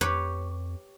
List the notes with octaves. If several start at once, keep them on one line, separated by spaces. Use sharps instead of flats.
F2 G4 B4 C#5